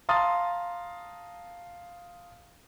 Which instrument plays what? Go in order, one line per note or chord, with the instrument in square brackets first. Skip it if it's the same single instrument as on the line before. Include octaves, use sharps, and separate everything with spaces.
[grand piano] F5 A5 A#5 C6 D#6 A6